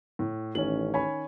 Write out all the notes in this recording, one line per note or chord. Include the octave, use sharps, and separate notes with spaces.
A2
A1 D#3 C#4 F#7
C#5 G#5 B5